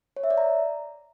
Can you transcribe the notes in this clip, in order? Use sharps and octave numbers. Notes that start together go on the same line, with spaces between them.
C#5
E5
D5
A#5